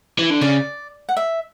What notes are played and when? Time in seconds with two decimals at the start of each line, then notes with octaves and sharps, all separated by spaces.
0.19 E3
0.30 D3
0.41 C#3 D5
1.09 F#5
1.17 E5